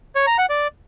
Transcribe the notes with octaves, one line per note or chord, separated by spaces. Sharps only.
C#5
A#5
F#5
D5